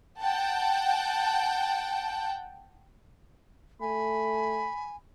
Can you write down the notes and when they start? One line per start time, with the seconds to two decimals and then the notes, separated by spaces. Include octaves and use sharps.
0.22 F#5 G5 A5
3.81 A3 G#5 B5